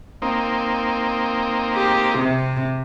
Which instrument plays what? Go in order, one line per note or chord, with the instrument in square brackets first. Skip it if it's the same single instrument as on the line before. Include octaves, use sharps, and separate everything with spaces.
[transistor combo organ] A#3 C4 D#4
[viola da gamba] G4
C3